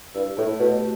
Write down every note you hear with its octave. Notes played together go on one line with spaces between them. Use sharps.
G2 E4
A2 A3
B2 G4